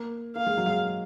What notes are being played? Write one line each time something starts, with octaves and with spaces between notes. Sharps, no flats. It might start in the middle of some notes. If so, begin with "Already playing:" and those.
Already playing: A#3
A#3 F5
G#3
F#3
G#3